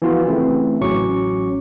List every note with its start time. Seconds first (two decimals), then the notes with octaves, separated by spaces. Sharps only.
0.02 E3 F3 B3 F4 F#4
0.27 C#3 E3 A3 C4
0.81 A1 F#3 C#4 C#6 D6